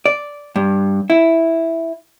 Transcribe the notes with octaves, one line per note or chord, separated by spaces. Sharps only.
D5
G2
E4